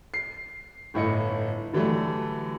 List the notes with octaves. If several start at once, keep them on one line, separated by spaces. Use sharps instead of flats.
C7
G1 A2 E4 D#5 C#7
D3 E3 F#3 G3 A3